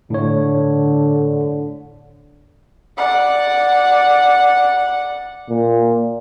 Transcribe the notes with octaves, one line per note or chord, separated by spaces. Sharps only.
A2 D3 C#5
D5 F#5
A#2